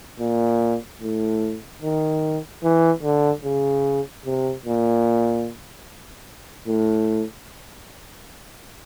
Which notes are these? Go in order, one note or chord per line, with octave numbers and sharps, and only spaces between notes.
A#2
A2
D#3
E3
D3
C#3
C3
A#2
A2